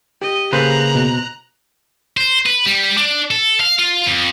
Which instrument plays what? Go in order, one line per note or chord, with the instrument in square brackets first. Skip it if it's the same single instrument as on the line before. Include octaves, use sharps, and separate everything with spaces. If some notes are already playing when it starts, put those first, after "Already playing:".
[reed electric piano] G4 [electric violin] D#5
[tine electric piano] C#3 A#3 G#4 [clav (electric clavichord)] B4 C5 [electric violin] A#5 F#6
[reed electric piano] B2
[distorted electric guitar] C5
B4
G3
D4
A4
F5
F4
F2